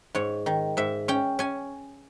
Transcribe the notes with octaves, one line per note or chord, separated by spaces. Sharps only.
G#2 C#5
D#3
G#2 E5
C#4 G5
C#4 G#5